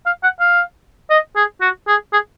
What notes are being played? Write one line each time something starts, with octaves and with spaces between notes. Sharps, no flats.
F5
F#5
F5
D#5
G#4
F#4
G#4
G#4